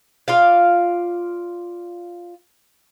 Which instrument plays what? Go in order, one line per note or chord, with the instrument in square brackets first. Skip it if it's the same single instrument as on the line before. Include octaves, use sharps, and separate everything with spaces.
[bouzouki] F4 D5 F5